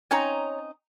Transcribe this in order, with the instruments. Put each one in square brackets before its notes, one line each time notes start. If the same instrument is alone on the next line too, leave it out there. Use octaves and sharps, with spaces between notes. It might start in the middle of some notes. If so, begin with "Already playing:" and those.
[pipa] C4 C#4 D#4 [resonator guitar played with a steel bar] C#5 A#5